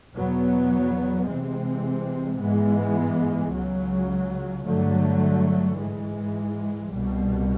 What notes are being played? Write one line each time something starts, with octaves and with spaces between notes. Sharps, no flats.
E2 B2 F#3 B3
C3 E3 G#3 C4
G#2 E3 G#3 B3
C#2 C#3 F#3
G2 D3 F#3 A3
G#2 E3 G#3
C2 B2 G3